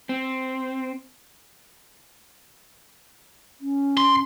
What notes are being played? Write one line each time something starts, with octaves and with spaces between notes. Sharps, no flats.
C4
C#4
C6